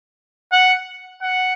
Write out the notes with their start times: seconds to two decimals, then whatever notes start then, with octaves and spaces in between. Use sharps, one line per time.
0.52 F#5
1.22 F#5